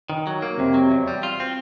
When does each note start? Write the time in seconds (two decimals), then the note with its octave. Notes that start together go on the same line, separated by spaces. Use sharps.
0.10 D#3
0.27 F#3
0.42 A#3
0.58 F2 C3
0.74 F#3
0.91 E2
1.08 G3
1.23 F4
1.40 C4